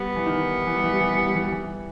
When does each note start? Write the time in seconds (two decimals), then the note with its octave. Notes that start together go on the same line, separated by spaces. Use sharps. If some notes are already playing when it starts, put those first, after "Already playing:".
Already playing: G3 B3
0.16 E3
0.26 D#3
0.67 E3
0.75 G3
0.84 E3
0.92 G3
1.01 E3
1.09 G3
1.18 E3
1.27 G3
1.35 E3
1.44 G3
1.52 E3